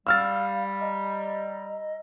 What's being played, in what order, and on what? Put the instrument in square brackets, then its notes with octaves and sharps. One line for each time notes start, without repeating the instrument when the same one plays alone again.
[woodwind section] G3 [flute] F5 [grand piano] E6 F6 A6
[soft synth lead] D#5 [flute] A#5